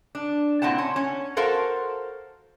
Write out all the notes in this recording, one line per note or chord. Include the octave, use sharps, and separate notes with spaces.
D4
A#2 C4 E4 F#5 A5
C#4
C#4
F#4 A4 A#4 C5 F5